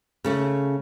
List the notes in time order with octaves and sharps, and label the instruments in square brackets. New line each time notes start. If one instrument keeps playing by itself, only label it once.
[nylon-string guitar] C#3 A3 C#4